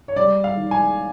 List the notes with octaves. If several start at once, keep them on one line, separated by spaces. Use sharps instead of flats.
C#5
G3 D5
F5
D#3
G#5